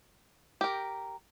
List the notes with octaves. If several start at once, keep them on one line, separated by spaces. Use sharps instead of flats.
G4 A#4